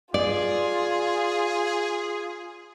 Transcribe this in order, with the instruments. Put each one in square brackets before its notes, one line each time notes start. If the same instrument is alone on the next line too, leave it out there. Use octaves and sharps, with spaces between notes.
[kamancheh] F4 [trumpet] G#4 [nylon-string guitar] D5